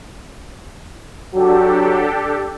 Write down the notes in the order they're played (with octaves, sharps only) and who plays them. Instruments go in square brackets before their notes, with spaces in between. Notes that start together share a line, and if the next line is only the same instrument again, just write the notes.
[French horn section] F#3 F#4 [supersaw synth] D4 G4 A4